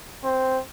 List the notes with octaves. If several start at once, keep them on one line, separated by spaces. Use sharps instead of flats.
C4